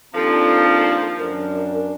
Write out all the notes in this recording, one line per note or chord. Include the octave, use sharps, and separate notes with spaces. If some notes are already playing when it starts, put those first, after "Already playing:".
D#2 F3 C4 D4 A4 A5
F#2 D4 A#4